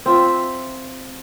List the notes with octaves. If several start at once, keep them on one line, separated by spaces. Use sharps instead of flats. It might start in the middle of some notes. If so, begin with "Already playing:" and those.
C4 F4 E5